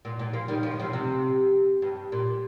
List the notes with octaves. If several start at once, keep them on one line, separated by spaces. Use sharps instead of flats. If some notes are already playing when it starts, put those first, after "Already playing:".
A#2
A#2
F3 A#3
D#3 G3
F3
D#3
C3 F3
C3
G2
A#2